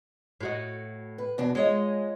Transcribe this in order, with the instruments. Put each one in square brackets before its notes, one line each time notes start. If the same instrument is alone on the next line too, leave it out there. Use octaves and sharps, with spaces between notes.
[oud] A2 F#4 D#5
[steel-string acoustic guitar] B4
E2 B2 D4
[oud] G#3 [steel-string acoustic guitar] F4 C#5 D#5